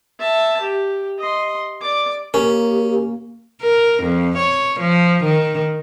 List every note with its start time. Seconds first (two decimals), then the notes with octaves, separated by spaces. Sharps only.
0.19 E5 A5
0.61 G4
1.19 D#5 C6
1.81 D5 D6
2.34 A#3 C#4 G4 A#4
3.63 A#4
4.04 F2
4.38 C#5
4.81 F3
5.24 D#3